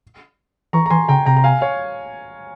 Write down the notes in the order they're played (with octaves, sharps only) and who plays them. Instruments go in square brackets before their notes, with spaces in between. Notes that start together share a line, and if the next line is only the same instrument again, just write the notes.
[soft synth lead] E3 [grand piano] A#5 C#6
[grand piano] A#5
[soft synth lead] E3 [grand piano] G#5 C6
[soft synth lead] C#3 [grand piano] G5 A#5
[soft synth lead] C3 [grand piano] G5 A#5
[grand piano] A#5
F5 G#5
C#5 F5